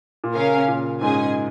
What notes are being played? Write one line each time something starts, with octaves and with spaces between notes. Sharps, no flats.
A#2
C#3 C#4 A#4 F5 G#5
A#2
G#2 C#4 G#4 D#5 G#5